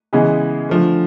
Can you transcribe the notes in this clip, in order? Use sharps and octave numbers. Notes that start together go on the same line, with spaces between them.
C#3 E3 G#3 B3
D3 F3 A3